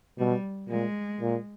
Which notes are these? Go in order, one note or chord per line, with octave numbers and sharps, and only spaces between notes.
B2 G3
A#2 G#3
A#2